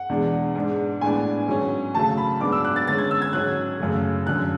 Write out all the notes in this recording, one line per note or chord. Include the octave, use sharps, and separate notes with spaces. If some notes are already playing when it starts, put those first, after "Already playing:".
Already playing: F#5
E2 B2 G#3 D4
G#2 G#3 D4
A2 G#3 B3 D4 G#5
G#2 F#3 C#4
C#3 F#3 A3 A5
B5
G#2 F#3 B3 D4 D6
E6
F#6
A6
D3 G#3 C#4 A6
G#6
E6
G#6
G#2 F#3 C#4 F#6
F#2 C#3 F#3 A3
F#2 D3 F#3 F#6